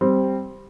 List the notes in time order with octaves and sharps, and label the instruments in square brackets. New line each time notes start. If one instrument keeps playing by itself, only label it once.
[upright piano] G3 C4